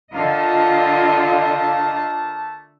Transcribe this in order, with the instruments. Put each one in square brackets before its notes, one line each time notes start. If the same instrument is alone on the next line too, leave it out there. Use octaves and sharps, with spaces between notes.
[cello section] D3 F4 D#5 [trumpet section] A3 A#3 A5 [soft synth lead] F5